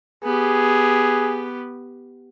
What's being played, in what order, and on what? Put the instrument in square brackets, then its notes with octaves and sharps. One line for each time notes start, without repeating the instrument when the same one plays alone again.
[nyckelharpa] B3 G4 [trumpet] G#4